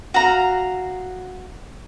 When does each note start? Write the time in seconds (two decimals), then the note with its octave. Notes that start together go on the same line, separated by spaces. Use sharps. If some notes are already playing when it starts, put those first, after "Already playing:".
0.14 F#4 F5 A#5